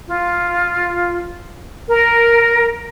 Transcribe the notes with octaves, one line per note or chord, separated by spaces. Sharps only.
F4
A#4